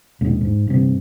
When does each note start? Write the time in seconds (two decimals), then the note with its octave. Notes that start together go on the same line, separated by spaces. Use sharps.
0.21 A#1 D#2 B2 G#3
0.41 G#2
0.67 G2 C3